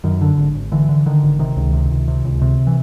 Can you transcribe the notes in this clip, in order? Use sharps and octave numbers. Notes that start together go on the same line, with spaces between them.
F#2 D#3
D3
G#1
G#1
D3 E3
D3
D3 D#3
G#1
C3 D#3
C#2
C3
C#2
C3
C#2
C3
E3